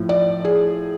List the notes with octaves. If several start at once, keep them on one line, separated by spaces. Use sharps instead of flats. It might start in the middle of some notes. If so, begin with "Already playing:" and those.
Already playing: A2 F3
D5
G#4